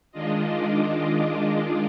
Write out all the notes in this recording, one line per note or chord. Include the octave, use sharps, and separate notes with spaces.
D#3 G#3 D4 F4 D#5
D5
D5
D#5